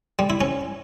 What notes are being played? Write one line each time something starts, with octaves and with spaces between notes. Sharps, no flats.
G3
E4
C#4